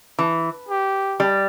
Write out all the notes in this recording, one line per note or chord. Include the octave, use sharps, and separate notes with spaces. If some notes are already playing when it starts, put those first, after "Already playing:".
E3
G4
G3